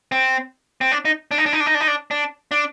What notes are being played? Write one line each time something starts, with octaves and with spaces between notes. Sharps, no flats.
C4
C4
D4
D#4
D4
D#4
D4
D#4
D4
D#4
D4
D#4
D4
D4
D4